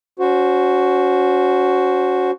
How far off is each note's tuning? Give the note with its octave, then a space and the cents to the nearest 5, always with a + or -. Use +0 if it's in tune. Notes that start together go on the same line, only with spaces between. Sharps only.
C#4 +30 F#4 +0 C5 +0